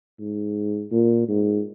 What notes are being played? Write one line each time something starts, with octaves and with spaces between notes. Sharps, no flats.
G#2
A#2
G#2